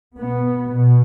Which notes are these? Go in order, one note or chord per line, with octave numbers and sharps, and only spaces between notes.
B2 B3
B2